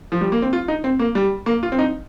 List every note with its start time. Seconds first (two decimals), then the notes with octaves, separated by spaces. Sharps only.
0.12 F3
0.21 G3
0.32 A#3
0.42 C4
0.53 F4
0.68 D#4
0.84 C4
0.99 A#3
1.15 G3
1.46 A#3
1.63 F4
1.72 C4
1.79 D#4